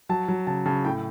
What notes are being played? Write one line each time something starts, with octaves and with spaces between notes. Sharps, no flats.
F#3 A5
F#3
C#3 A5
C#3 A5
A2 G5